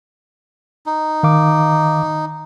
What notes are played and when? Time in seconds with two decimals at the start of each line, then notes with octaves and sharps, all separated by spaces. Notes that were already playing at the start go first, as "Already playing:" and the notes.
0.86 D#4
1.23 D#3 F5 D6